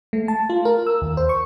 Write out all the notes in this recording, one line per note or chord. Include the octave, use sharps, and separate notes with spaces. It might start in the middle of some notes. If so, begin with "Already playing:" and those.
A3
A5
F4
A#4
E6
D#2
C5
C#6